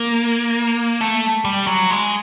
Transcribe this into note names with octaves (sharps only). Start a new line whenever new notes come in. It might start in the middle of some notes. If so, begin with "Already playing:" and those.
Already playing: A#3
A3
G3
F#3
G#3